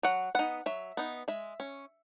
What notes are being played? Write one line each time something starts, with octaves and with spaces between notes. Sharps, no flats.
F#3 F#5
B3 D#4 F#5
F#3 E5
B3 D#4
G#3 E5
C#4